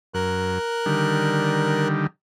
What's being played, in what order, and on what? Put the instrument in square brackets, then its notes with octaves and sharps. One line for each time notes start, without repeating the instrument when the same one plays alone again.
[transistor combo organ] F#2 [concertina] A#4 F#6
[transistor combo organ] D3 D#3 G3